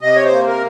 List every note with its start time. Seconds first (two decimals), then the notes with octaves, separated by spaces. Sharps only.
0.01 C3 D#5
0.15 C#5
0.24 C5
0.32 A#3
0.47 A#4